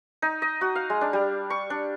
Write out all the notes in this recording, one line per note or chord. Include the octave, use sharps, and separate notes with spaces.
D#4
D#5
F#4
F5
G#3
D4
G3
C#6
D4